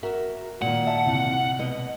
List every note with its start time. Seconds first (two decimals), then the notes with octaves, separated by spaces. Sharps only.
0.03 F#4 A#4 E5
0.62 A#2 D#3 F#5
0.86 E5 A5
1.06 C2
1.59 B2 D#5